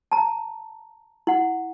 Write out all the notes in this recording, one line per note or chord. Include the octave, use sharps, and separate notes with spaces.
A5 A#5
E4 F#5